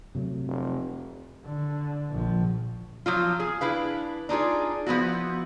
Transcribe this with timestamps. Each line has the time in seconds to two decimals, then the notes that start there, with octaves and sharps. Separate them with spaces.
0.15 C3 F#3 A3
0.47 F1
1.45 D3
2.10 A#1 F3
3.06 F3 F#3 F4
3.40 G#4
3.61 D4 E4 B4 F5
4.29 D4 D#4 F4 G#4
4.86 F3 B3 E4 F#4